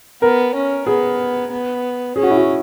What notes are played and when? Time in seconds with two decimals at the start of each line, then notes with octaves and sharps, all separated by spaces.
0.22 B3 A#4
0.55 C#4
0.86 B3 G#4
1.51 B3
2.16 C#4 G#4
2.23 F#4
2.31 E4
2.37 F#4